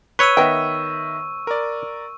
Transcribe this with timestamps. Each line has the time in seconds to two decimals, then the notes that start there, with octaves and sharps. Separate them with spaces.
0.19 B4 C#5 C#6 E6 D#7
0.37 D#3 B3 D#5 E5 G5
1.47 A#4 D5